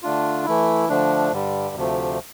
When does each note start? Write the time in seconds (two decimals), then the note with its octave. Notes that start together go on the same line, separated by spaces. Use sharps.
0.03 D3 A3 D4 F4
0.45 E3 A3 E4
0.89 D3 F3 A3 D4
1.32 G2 D3 G3
1.76 D2 C3 F3 A3